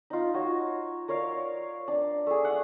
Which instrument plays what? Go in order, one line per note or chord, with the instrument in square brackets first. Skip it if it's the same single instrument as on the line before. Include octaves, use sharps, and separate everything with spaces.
[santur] D#4 F4
F#4 C#5
A#4 C#5 D5 F5
D4
A3 G#4
E5 F#5